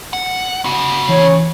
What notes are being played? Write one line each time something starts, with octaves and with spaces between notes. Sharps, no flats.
F#5
C#3 F#4
E3 C#4 C#5